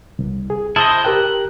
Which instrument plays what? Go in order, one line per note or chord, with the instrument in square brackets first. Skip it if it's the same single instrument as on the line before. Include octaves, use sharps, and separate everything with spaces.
[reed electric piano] C2
G#4
[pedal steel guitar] E4 C5 D#5 [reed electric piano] A5 D#6 F6
[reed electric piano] G4 A#4 G5 [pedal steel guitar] F#6